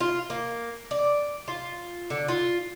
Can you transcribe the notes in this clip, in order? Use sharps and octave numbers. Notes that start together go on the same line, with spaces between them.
F4
A#3
D5
F4
D3
F4